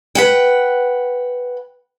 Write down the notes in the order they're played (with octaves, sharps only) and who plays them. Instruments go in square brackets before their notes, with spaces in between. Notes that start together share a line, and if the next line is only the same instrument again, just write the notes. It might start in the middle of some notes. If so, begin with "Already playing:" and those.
[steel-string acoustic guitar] B4 F#5 G5